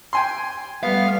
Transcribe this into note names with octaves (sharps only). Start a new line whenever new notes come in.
G5 G#5 C6
G3 A3 B3 F5